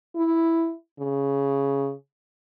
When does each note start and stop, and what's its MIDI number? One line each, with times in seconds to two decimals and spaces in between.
0.16 0.73 64
0.99 1.92 49